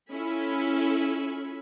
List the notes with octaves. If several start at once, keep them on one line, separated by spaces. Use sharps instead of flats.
C#4 E4 F4 A4 G#5 B5